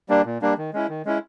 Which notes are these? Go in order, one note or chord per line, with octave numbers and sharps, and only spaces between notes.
G3 A#3 D4
A#2
G3 A#3 D4
D#3
G#3 C#4 E4
D#3
G#3 C#4 E4